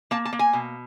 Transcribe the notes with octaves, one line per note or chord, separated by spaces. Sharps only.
A#3 A5
A5
A#3
G#5
B2